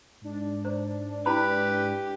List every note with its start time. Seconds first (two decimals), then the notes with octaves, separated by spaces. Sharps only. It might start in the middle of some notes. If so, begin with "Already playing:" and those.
0.21 G#2 D4
0.65 C5
1.26 E4 G4 B4 B5